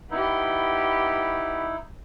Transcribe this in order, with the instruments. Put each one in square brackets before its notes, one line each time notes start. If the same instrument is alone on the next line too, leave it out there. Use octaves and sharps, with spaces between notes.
[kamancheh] B3 G4 [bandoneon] D#4 E4